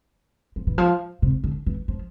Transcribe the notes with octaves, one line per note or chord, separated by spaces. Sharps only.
F3
E3
F3
C3
D3
E3
F3